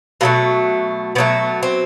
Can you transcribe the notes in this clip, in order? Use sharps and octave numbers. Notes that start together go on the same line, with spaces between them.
B2 F#3 A3 A#3
B2 F#3 A3 B3
C4